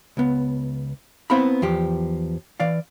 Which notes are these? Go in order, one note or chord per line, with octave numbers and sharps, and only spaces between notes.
C#2 B3
B3 C4 E4 F5 A#5 B5
E2 F3 G4
E3 D5 F5